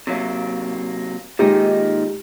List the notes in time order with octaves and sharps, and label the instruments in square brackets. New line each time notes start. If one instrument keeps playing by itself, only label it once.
[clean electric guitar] C3 F#3 A#3
[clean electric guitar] A#2 D#3 D#4 [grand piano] G#3 G4